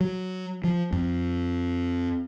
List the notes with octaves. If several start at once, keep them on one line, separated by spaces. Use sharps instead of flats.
F#3
F3
F2